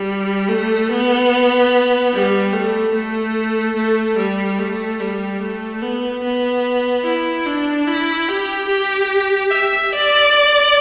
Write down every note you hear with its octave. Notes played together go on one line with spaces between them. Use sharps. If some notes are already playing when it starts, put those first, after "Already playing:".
Already playing: G3
A3
B3
G3
A3
A3
A3
G3
A3
G3
A3
B3
B3
E4
D4
E4
G4
G4
E5
D5